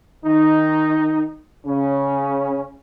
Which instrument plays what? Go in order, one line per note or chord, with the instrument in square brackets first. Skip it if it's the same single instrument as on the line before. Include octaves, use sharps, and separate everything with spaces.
[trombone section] D#3 D#4
C#3 C#4